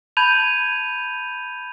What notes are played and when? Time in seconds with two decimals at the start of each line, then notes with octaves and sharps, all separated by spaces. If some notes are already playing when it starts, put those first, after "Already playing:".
0.17 A5 B5 G6 G#6 D#7 F7